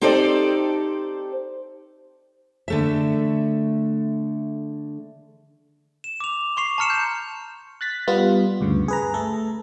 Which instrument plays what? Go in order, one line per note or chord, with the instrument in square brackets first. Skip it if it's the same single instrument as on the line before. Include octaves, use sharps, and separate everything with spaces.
[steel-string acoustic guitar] C4 D#4 G4 A4 C5 D5
D3 A3 E5
[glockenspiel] E7
D6 F7
C6 C#6 C7 F7
A5 A#5 F6 C#7 E7
G6
[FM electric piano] F#6 A6 B6
G3 B3 F4
D2 G2 C#3
G#4 B4 A#5
A3 A4